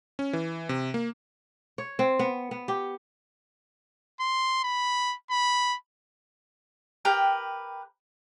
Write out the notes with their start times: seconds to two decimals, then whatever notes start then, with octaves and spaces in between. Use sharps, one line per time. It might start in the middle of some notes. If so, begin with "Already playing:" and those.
0.19 C#4
0.33 E3
0.69 C3
0.94 A#3
1.78 C#5
1.99 C4
2.19 B3
2.51 B3
2.68 G4
4.20 C6
4.63 B5
5.31 B5
7.05 G4 A#4 B4 G5